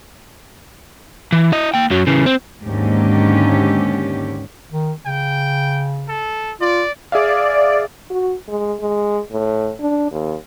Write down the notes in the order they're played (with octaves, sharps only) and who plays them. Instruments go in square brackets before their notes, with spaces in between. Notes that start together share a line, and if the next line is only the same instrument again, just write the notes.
[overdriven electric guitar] E3
E4 D#5
A#3 G5
F#2 F#3
C#3 E3
C4
[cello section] D#2 G#2 D3 A#3 C#4 G4
[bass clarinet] D#3
[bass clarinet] C#3 [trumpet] G5
[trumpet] A4
[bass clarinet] F4 [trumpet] D5
[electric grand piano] G#4 E5 F5 [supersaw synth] D5
[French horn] F#4
G#3
G#3
A2
D4
D#2